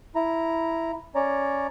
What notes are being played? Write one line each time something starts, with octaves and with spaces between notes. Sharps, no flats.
E4 A#5
C#4 C#5 D5 A#5